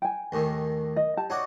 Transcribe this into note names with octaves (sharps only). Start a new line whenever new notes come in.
G5 G#5
D#2 A2 D#3
D#5
G4 A5
D#4 F#4 C#5 D5